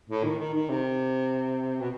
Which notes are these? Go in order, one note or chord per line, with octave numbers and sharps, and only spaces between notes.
A2
D#3
D#3
D#3
C3
B2